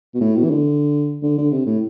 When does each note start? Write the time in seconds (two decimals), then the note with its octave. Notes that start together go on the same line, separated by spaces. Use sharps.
0.15 B2
0.21 A2
0.36 B2
0.44 E3
0.50 D3
1.23 D3
1.38 D3
1.52 C3
1.66 A2